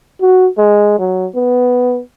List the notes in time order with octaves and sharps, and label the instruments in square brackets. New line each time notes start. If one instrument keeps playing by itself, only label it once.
[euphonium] F#4
G#3
F#3
B3